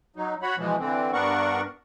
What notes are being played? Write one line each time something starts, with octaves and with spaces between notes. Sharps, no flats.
F#3 D#4
F#4 C#5 F#5 B5
B2 E3 F3 G#3
D3 E3 C4
G2 B3 D4 A#4 F#5 C#6